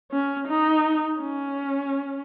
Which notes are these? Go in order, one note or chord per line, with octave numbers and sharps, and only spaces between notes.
C#4
D#4
C#4